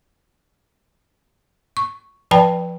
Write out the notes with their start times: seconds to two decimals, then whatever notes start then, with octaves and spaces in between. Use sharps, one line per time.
1.77 C#6
2.31 F3 B4 D5 G5 A5 B5